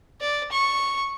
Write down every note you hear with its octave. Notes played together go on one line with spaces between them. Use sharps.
D5
C#6